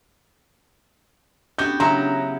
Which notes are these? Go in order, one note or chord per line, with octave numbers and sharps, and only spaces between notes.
B3 C#4 D4 F#4 G4 G6
C#3 F#3 E4 A#5